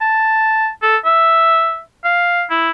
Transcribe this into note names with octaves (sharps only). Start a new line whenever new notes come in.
A5
A4
E5
F5
E4